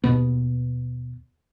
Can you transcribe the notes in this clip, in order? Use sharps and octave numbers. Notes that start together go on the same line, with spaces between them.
D#2 B2 B3